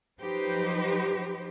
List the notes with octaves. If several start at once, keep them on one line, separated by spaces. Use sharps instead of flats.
F3 F#3 D#4 G4 B4 C5